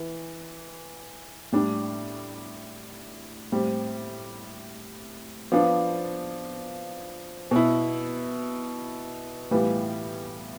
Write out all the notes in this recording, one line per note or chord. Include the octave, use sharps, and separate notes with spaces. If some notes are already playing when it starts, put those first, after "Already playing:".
Already playing: E3
A2 G3 D4
A2 G3 C4
F3 B3 D4 F4
B2 B3 E4
A2 E3 G3 B3 F4